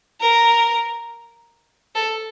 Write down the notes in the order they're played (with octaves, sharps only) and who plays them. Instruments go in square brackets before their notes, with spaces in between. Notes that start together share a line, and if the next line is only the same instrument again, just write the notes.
[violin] A#4
A4